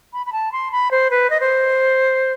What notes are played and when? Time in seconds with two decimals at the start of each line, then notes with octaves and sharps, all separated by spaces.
0.13 B5
0.26 B5
0.33 A5
0.52 C6
0.72 B5
0.91 C5
1.11 B4
1.30 D#5
1.40 C5